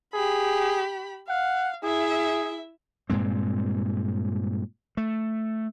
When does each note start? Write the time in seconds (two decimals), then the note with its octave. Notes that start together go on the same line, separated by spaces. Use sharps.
0.14 G4 G#4 B5
1.29 F5 F#5
1.83 E4 G#4 E5
3.10 G2 A#2 G#3 C4
4.97 A3